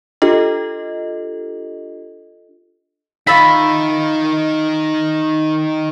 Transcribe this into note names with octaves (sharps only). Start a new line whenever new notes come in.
D4 F4 G4 A4 D#5
D#3 D#4 F4 E5 B5